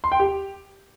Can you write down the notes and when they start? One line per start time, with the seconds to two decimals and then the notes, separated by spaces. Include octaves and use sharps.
0.04 C6
0.12 G5
0.19 G4